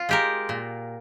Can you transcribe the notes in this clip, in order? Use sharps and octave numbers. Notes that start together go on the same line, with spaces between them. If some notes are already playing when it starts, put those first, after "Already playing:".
Already playing: F4
G#3 G4 A#4
A#2